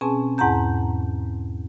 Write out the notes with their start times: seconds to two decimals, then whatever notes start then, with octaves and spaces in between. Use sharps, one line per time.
0.01 B2 C4 C#4 G#4 G#5 A5
0.38 E2 G#2 F#5 A5 A#5 G6